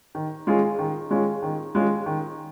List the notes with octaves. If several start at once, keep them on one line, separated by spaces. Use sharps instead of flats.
D#3
G#3 C#4 F4 G#4
D#3
G#3 C#4 F4 G#4
D#3
G#3 C#4 F4 G#4
D#3